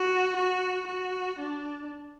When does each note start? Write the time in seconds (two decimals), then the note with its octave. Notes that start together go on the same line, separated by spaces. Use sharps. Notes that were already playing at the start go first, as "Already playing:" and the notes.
Already playing: F#4
0.37 F#4
0.88 F#4
1.40 D4